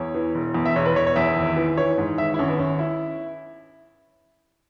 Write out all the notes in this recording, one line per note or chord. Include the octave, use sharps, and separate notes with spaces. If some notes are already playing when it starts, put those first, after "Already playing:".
Already playing: E2 C#5
E3
E1
E2
E5
E1 C#5
B4
E1 C#5
C#5
E2 E5
G#1
E3
E3 C#5
G#2
G#1 E5
E4
G#1 C#4
B3
G#1 C#4
E4